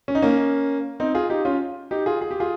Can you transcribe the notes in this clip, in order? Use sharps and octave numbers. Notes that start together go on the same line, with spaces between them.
C#4
D#4
A#3 C#4
C4 D#4
F4 G#4
D#4 G4
C#4 F4
D#4 G4
F4 G#4
G#4
G4
F4 G#4